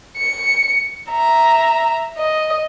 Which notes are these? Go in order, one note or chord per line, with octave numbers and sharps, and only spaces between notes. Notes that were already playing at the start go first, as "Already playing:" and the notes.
C#7
E5 A#5
D#5